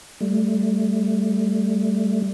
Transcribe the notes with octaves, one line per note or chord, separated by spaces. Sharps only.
G3 A3